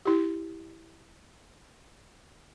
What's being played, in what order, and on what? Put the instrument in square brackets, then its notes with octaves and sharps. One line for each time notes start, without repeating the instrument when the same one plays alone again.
[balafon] E4 G4